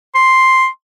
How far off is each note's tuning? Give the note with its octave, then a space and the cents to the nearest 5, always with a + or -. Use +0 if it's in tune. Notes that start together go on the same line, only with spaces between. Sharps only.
C6 +0